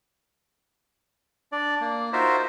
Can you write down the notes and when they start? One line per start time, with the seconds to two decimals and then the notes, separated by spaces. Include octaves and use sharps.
1.52 D4 D5
1.81 A#3
2.13 D#4 F4 F#4 A#4 C5 E5